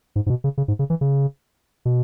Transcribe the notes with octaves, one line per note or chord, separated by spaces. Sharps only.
G#2
G#2
B2
C#3
C#3
G#2
C#3
E3
C#3
B2